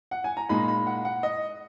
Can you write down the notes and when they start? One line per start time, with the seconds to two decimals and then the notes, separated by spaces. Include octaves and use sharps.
0.11 F#5
0.24 G#5
0.37 A#5
0.49 A#2 G#3 D#4 B5
0.68 B5
0.87 F#5
1.05 F#5
1.23 D#5